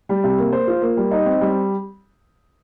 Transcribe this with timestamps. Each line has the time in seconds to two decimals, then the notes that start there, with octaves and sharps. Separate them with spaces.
0.09 G3
0.24 C3
0.38 A#3
0.52 C5
0.68 F4
0.82 A#3
0.97 G3
1.11 D#4
1.26 C4
1.41 G3